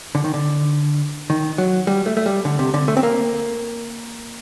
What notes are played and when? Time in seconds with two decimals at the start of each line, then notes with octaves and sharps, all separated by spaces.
0.15 D3
0.24 D#3
0.34 D3
1.30 D#3
1.58 F#3
1.87 G3
2.06 A3
2.17 A3
2.26 G3
2.45 D3
2.59 C3
2.74 D3
2.88 A3
2.97 C4
3.03 A#3